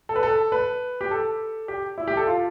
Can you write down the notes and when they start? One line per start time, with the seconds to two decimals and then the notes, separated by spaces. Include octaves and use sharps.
0.09 A4
0.16 B4
0.23 A4
0.52 B4
1.01 G4
1.11 A4
1.68 G4
1.98 E4
2.08 G4
2.17 A4
2.27 F4